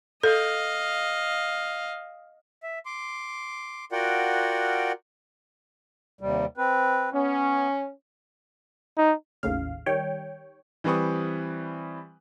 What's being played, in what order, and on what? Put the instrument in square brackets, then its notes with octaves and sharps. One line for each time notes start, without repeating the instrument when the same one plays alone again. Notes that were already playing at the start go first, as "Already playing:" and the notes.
[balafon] A4 [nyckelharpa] D#5 F5
[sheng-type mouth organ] E5
C6 D6
F4 F#4 A#4 D5 F#5 G5
[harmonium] D#2 C3 G3
C4 B4
[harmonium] B3 [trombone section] C#4
[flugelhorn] D#4
[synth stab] G#1 D#2 A2 C#3 F5
D#3 G3 C#5 G5
[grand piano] E3 G3 C4 B4 C#6 D#6